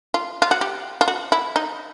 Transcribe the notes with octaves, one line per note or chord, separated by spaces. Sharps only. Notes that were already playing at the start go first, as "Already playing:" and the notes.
F4
F4
F#4
G4
F4
F#4
E4
D#4